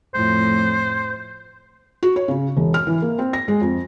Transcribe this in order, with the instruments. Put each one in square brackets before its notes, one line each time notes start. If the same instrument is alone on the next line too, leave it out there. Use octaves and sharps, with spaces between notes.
[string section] F2 A2 [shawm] C5
[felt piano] F#4
C#5
C#3
E1
F6
E3
A#3
C4
A#6
G#3
F2